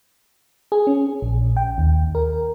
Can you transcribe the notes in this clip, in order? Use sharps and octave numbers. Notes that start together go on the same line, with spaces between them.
G#4
C#4
A#1
G5
D#2
A#4